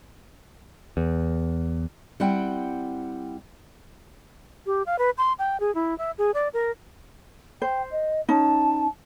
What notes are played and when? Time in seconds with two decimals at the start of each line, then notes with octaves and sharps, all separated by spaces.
0.97 E2
2.20 G3 C4 E4 F#5 G5
4.66 G4
4.86 F5
4.99 B4
5.18 C6
5.39 G5
5.60 G#4
5.75 E4
5.98 E5
6.18 G#4
6.34 D5
6.54 A#4
7.62 C5 G5
7.91 D#5
8.29 C#4 D#4 A5